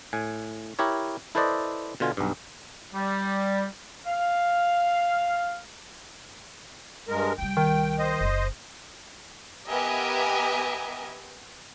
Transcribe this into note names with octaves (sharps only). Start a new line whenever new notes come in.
A2 G#5
E4 G4 A#4 C#5
E4 A4 B4 C5 D5 D#5
B2 D3 F4 G#5
B1 G2
G3
F5
G2 G#3 A#4
C2 G3 G5
D#3
C5 D#5
F#1 D#4
B3 G4 A#4 D#5 E5 G#5